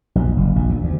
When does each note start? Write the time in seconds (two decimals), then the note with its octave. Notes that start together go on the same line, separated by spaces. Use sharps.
0.15 A#1
0.37 F#1
0.56 A#1
0.69 D2
0.84 D2